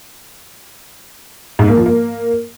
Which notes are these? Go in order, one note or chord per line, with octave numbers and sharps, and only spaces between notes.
G#2
A#3
F3
A#3